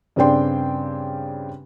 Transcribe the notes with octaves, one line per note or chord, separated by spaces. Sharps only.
G2 C#3 C4 D4 G5 C6